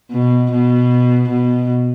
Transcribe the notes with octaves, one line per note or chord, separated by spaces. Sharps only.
B2
B2
B2